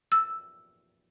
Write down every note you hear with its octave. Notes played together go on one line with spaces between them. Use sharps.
E6